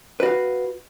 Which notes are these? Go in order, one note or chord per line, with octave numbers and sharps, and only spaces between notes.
F#4 B4 F5